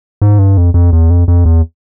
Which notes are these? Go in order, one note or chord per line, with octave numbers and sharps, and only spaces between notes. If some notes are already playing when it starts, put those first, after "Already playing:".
G#2
G2
F2
F2
E2
F2
F2
E2